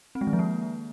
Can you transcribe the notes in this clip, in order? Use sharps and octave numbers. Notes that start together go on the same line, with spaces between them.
C4
G#3
D#3
F3
A#3